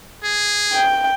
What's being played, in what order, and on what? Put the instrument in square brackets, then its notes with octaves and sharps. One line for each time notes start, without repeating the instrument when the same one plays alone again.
[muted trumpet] G#4
[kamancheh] G5